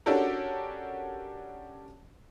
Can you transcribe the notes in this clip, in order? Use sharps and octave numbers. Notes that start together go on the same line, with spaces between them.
C#4 D4 F#4 G4 A4 A#4